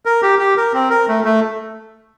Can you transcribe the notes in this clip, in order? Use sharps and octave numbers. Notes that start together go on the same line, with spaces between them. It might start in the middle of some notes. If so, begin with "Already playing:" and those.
A#4
G4
G4
A#4
C4
A#4
A3
A3